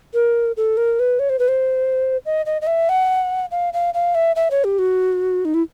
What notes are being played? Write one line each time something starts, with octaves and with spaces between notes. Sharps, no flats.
A#4
A4
A#4
B4
C#5
C5
B4
C5
D#5
D#5
D#5
E5
F#5
F5
F5
F5
E5
E5
C#5
G4
F#4
D#4
E4